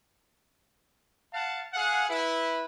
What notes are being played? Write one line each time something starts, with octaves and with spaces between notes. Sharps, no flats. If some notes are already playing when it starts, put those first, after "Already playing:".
F5 F#5 A5
G#4 F5 F#5
E4 B4